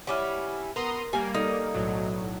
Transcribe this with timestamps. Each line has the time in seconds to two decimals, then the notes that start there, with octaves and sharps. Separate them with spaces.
0.07 G3 C#4 E4 F#5 D6 F6
0.76 B3 A#4 A#5 C6 D#6
1.13 G3 A#3 G4 G#5
1.35 D#4 A4 D5 D#6
1.74 B1 A2 F#3